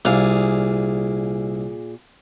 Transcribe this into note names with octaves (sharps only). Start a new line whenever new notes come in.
C2 A#2 G#4 F5